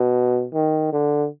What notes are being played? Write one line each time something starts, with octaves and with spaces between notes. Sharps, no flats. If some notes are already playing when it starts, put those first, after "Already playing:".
Already playing: B2
D#3
D3